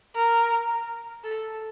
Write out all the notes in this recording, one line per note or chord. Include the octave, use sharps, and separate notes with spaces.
A#4
A4